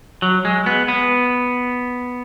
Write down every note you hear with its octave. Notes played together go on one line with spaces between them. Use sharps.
F#3
G#3
B3
B3